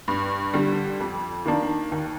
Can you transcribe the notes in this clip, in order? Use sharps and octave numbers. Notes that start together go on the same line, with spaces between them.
G2
D3 G3
F2
D#3 A#3 D4
D#2